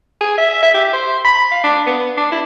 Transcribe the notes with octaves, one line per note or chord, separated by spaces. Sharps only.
G#4
E5
E5
G4
C5
B5
F5
D4
B3
D4
E4